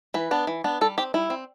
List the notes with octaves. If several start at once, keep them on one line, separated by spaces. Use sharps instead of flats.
E3 B4
B3 D4
E3
B3 D4
G3 A4
C4 G4
G3 E4
C4